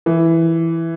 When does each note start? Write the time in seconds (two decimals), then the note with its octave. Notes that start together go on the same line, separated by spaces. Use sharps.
0.06 E3